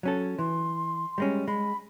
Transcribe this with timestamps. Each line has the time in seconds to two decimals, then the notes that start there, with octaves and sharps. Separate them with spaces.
0.03 F#3 C#4 A4
0.39 E3 C6
1.18 G3 G#3 C#4
1.48 G#3 B5